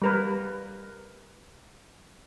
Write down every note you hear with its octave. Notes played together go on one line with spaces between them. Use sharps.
G3 A#4 B4